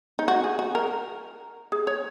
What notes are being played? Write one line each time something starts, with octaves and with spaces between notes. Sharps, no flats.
D#4
F#4
G#4
F#4
A#4
G#4
C#5